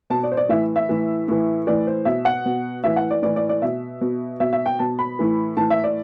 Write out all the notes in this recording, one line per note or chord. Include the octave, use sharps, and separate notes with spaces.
B2 A5
D5
C5
D5
A2 E3 E5
E5
A2 E3
A2 E3
A2 E3 D5
C5
B2 E5
F#5
B2
A2 E3 E5
F#5
D5
A2 E3 D5
D5
D5
B2 E5
B2
B2 E5
E5
G5
B2 A5
B5
A2 E3
A2 E3 A5
E5
D5